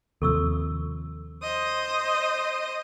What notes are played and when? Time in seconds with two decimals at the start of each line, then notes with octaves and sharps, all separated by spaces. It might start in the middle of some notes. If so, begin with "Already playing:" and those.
0.22 D#2 C3 F3 A4 C#6 E6
1.41 C5 D#5 D#6